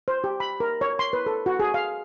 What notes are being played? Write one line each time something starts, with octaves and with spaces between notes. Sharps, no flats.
C5
G4
B5
A#4
C#5
C6
B4
A4
F#4
G#4
F5